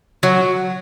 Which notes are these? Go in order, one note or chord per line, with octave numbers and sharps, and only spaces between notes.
F#3